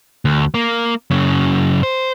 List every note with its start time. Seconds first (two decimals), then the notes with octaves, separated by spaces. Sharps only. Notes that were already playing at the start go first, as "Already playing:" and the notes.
0.25 D2
0.54 A#3
1.10 F#2 C#3
1.83 C5